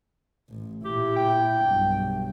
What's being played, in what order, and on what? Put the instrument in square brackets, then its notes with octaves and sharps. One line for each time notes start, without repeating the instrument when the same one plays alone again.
[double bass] A1
[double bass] A#2 E4 [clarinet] G4
[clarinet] G5
[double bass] B1 G2